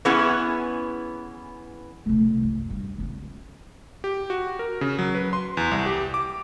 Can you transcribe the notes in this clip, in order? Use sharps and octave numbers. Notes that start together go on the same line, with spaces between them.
E3 B3 C#4 E4 G#4 F#5
B2 A3
C2
F#2
G2
C#2 B3
G4
F#4
A#4
C#3
F#3
B4
C6
E2
C2
G4
D6